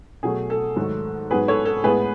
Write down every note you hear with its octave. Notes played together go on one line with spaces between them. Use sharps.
B2 F#3 A3 G#4
A4
G#2 D#3 F#3 A3
G#2 F#3 B3 G#4 B4
A4 C#5
A4
A2 G#3 B3 G#4 B4